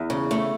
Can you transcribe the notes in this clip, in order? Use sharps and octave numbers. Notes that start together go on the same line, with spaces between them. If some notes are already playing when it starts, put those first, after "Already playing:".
Already playing: E2
C#3
A3